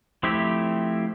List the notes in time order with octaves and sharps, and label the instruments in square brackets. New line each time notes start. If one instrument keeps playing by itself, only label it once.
[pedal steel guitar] F3 A3 C4 E4 G4